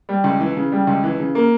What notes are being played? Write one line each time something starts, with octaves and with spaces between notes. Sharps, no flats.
G3
C#2
E3
C#3
G3
C#2
E3
C#3
A#3